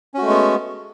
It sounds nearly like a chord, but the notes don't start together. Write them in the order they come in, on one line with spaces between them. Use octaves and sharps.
C#4 F#4 A3 G#3 B3